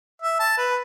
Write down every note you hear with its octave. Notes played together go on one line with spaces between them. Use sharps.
E5
A5
B4